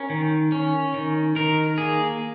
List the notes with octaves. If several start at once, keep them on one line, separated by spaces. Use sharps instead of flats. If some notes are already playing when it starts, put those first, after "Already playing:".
Already playing: C#4 A#4
D#3
C#4
D#3
D#3 A#4
A#3 G#4